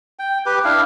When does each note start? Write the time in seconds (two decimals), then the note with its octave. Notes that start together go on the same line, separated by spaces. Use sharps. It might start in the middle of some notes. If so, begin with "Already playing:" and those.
0.19 G5
0.46 G4 B4
0.64 D4 E4 F5